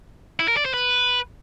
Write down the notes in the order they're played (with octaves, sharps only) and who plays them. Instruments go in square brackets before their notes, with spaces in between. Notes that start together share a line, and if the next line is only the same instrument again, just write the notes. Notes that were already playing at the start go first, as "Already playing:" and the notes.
[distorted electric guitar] E4
A#4
D5
C5
B4